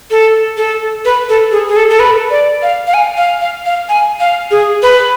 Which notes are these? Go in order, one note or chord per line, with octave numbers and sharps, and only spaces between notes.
A4
A4
B4
A4
G#4
G#4
A4
A4
B4
D5
F5
F5
G#5
F5
F5
F5
G#5
F5
G#4
B4